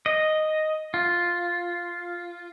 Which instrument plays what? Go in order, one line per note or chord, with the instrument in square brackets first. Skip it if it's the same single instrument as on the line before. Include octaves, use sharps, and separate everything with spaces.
[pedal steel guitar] D#5
F4